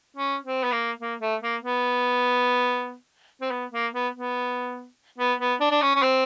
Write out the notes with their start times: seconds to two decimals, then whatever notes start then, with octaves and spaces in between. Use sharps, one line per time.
0.16 C#4
0.44 C4
0.63 B3
0.72 A#3
1.00 A#3
1.21 A3
1.42 A#3
1.63 B3
3.41 C4
3.51 B3
3.72 A#3
3.93 B3
4.13 B3
5.18 B3
5.40 B3
5.60 D4
5.71 D4
5.82 C#4
5.95 C#4
6.02 C4